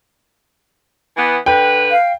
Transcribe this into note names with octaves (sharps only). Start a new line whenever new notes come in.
E3 B3
D3 B4 G5
F5